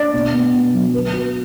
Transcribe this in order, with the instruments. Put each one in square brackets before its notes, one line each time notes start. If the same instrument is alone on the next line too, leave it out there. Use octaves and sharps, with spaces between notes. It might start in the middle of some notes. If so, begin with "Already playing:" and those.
Already playing: [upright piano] D4 [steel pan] D5
[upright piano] B2
B3
B2
F#3
B4
F#4